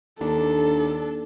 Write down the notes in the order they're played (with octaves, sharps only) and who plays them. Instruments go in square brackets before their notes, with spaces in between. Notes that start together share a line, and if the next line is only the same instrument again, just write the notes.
[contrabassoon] D#2 [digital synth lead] D4 [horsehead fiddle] A4